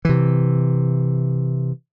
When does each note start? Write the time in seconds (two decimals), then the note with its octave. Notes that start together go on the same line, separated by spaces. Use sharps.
0.05 C3 E3